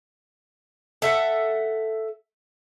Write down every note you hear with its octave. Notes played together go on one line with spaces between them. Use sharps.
A4 E5 F#5